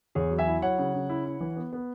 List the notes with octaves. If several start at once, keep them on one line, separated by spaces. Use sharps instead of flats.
E2 G#4 C#5
F#3
E5 G#5
E4
F#3 C#5 F#5
C#3
C#3
E4
E4
E3
B3
B3